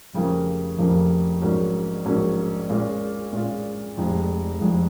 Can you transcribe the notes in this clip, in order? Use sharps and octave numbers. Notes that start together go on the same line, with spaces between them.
F1 F2 C#3 F3 A#3
F1 F2 C#3 F3 A#3
A#1 G#2 F#3 A#3 C#4
A#1 G#2 F#3 A#3 C#4
A#2 G#3 C#4 F4
A#2 G#3 C#4 F4
F1 F2 F3 G#3
F1 F2 F3 G#3